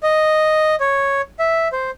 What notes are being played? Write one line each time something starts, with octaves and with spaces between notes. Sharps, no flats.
D#5
C#5
E5
C5